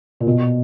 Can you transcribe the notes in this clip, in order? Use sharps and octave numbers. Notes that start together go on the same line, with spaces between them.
A#2
B2